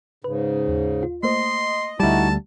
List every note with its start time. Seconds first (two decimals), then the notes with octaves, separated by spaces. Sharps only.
0.24 G#2 C#3 B4
0.68 D#2
1.03 F4
1.23 A3 A#3 C5 D#5 C6
2.00 D2 G3 D#4 E4 F#4 A5